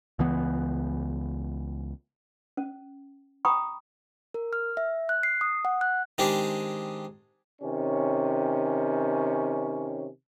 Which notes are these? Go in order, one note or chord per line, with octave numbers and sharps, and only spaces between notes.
C#2 E3 B3
C#4
G5 A#5 B5 C#6 D#6
A#4
F6
E5
F#6
C7
D#6
F#5
F#6
D#3 G#3 C4 D4 G4 G#4
C3 D#3 C#4